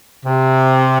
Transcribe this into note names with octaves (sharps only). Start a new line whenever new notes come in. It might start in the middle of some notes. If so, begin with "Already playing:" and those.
C3